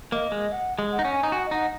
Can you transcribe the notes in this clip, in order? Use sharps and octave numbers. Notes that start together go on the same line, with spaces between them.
A#3 D#5
G#3
F#5
G#3
F#5
D#4
C#4
G#5
D#4
F#4 G#5
F#5
D#5
D#4 F#5